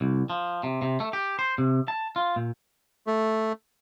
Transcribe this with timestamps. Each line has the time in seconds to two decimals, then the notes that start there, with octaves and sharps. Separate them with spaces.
0.01 C2
0.30 F3
0.63 C3
0.82 C3
1.00 A3
1.13 G4
1.39 C5
1.58 C3
1.88 A5
2.16 F4
2.36 A#2
3.07 A3